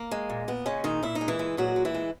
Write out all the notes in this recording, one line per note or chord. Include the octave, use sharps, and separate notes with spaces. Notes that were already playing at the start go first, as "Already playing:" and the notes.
Already playing: A#3
G#3
A#2
A#2 B3
C#3 G#3 C#4
A#2 D#3 D#4
A#2 E4
D#4
G#3
E3 E4
G#3
A#2 F#3 F#4
G#3
E3 E4
G#3